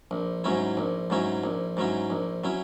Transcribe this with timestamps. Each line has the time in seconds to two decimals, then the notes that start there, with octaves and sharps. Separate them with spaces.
0.11 A#1
0.44 G#2 F#3 C#4 E4
0.77 A#1
1.10 G#2 F#3 C#4 E4
1.44 A#1
1.77 G#2 F#3 C#4 E4
2.10 A#1
2.44 F#3 C#4 E4